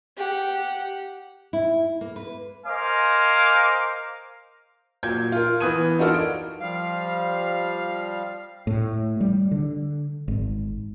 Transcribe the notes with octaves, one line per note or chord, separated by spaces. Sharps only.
G4 F#5
E4
A#3
B4
A#4 C5 D#5 F5 G#5 D6
A#2 F#3 G6 G#6
F4 A#4
E3 B3 D#6 F#6 G#6 D#7
D4 D#4 F4 F#4 A4 A#4
D7
F3 G3 F5
A2
G3
D3
G#1